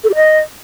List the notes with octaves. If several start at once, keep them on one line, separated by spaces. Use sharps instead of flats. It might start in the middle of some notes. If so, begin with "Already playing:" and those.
A4
G4
D#5